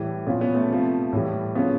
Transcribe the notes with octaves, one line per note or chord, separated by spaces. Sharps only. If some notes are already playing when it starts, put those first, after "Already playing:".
Already playing: A2 E3 G3
A#2 F3 B3 C#4
B3 C#4
A3 B3
C3 F3
A2 E3 G3
C#3 F3 B3 C#4